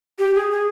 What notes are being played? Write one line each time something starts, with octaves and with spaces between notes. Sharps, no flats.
G4
G#4
G#4